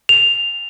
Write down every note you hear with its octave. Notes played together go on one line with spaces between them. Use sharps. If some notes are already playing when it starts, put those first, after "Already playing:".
F7